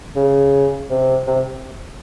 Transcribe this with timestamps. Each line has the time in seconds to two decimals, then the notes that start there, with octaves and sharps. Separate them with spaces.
0.16 C#3
0.90 C3
1.27 C3